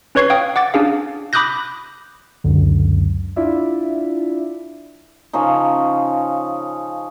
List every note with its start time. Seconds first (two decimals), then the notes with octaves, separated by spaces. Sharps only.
0.15 C#4 B4 C#5 C#6 G#6 C7
0.30 F5 G5 D#6
0.56 F#5 D6 A6
0.74 C#4 D4 G#4 F5
1.33 B5 D6 D#6 F#6 G6 A#6
2.44 C#2 F#2 D3
3.36 D4 E4 F4 D5 E5
5.33 C#3 F3 C#4 D#4